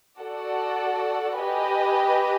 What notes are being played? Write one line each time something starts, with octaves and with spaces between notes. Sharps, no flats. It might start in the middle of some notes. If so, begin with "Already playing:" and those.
F#4 A4 D5 F#5
G4 B4 D#5 G#5